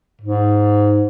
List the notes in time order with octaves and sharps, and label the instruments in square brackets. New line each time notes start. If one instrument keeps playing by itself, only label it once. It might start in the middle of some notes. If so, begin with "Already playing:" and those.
[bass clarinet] G#2